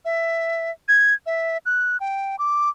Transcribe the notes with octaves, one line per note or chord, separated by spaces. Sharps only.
E5
G#6
E5
F#6
G5
D6